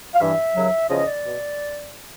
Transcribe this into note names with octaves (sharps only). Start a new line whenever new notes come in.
F5
G2 E3 E5
D#2 C#3 F#3
E2 C#3 F3 D#5
D5
B2